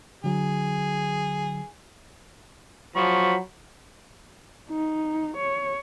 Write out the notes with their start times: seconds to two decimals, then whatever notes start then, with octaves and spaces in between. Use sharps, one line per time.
0.24 D3 F#3 G#4
2.96 F3 F#3 B5 C#6
4.69 D#4
5.37 C#5